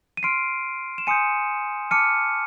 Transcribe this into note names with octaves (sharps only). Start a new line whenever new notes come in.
D#7
C6 F6 C7 D7
E7
G#5 C6 D#6 G6 C#7 D#7
A5 D6 F6 C#7 D#7